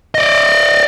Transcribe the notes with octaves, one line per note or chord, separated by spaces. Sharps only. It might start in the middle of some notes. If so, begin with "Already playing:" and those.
D5 D#5